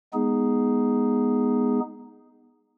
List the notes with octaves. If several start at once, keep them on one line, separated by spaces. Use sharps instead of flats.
G#3 B3 D#4 G#4